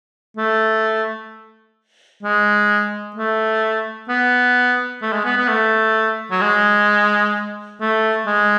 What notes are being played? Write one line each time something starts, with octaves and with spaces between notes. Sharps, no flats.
A3
G#3
A3
B3
A3
G#3
B3
B3
A3
F#3
G#3
A3
G#3